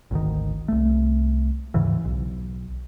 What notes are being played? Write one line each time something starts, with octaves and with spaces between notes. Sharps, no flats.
G#1 D2 D#3
C2 A3
D#2 G#2 C#3 E3
B1